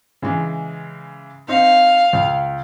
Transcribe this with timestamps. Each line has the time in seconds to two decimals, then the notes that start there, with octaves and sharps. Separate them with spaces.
0.22 C#3 E3 G#3
1.48 C4 D#4 F5
2.13 C#2